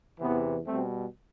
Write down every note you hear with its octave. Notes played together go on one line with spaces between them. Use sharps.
E2 C3 E3 B3
B2 G3 A3 C4